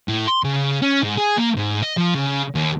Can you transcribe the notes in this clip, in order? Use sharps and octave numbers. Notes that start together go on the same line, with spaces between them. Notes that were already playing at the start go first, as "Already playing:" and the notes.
A2
C6
C#3
C#4
G#2
G#4
A#3
G#2
D#5
F3
C#3
D#2